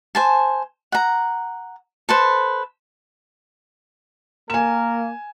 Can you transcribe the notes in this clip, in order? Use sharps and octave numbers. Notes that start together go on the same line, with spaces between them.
C5 G#5 A5
F#5 A#5
A4 B4 C5
A#3 A#4 G#5 E7